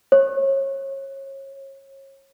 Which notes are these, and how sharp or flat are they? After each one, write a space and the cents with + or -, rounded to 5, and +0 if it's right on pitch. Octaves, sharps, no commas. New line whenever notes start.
C#5 -30